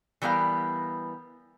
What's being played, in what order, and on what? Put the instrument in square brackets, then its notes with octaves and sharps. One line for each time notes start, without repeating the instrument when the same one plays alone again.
[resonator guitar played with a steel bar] E3 G3 B3 A#4 F5